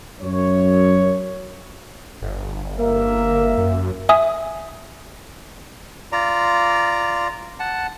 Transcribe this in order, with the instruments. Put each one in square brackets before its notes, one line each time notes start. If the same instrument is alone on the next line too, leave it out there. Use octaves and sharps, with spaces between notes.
[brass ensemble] F#2 C#5
[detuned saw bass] G1
[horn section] A#3 A#4 E5
[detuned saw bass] F#2
[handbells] E5 G#5 D#6
[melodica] F4 D5 A#5
F#5 A5